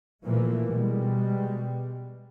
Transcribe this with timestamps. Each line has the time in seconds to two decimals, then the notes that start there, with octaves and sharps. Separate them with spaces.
0.24 A#2 E3 F3 A3 A#3
0.67 B2 G3 G#3